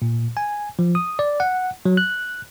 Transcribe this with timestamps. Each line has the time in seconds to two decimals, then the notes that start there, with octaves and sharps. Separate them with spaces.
0.02 A#2
0.37 G#5
0.79 F3
0.95 D#6
1.19 D5
1.40 F#5
1.85 F#3
1.97 F#6